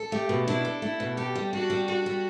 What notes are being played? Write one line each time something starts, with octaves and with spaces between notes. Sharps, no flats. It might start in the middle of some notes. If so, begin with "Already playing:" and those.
Already playing: A4
A3 G4
B2
D4 E4
A4
A3 E4
B2
G4 A4
G3
D4 F#4
G3
F#4 A4
G3